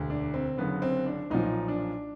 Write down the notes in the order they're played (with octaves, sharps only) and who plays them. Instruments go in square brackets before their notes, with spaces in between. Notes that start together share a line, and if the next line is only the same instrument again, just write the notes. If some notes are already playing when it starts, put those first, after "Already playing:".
Already playing: [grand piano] E1 D2 D3
D4
C4
F#1 F#2 D3 B3
C4
D4
B1 A#2 F3 D#4
D4